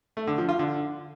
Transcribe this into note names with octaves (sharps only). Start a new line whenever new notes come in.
A3
D3
F3
F4
D3